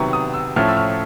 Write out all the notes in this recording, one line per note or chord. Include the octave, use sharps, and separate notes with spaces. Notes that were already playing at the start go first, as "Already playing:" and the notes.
Already playing: C3 D#3 F#3 B3 C#6
D#6
E6
A2 F3 A3 C#4 F6
E6
F6